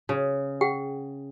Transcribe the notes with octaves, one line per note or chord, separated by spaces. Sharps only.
C#3
G#4 F#5 G5